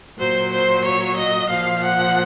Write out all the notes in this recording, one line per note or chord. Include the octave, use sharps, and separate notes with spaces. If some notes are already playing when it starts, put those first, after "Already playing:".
A#2 F#3 C5
C5
C#5
D#5
A#2 F3 F5
F#5